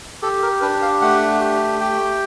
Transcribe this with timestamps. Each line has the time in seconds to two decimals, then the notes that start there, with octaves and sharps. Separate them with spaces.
0.22 G4 A4
0.42 A#4
0.62 D4 B4
0.82 F5
1.02 A3 F#5
1.40 G4
1.80 G4 G5